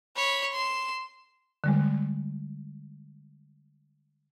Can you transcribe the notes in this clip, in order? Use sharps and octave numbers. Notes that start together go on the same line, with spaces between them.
C#5 B5
C6 E7
D3 G3 G#3